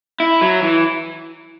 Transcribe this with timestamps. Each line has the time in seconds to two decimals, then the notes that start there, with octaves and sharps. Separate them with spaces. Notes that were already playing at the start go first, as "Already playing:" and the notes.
0.20 E4
0.41 F#3
0.63 E3